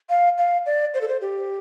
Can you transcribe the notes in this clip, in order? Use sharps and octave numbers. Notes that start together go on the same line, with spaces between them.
F5
F5
D5
C5
A4
C5
G4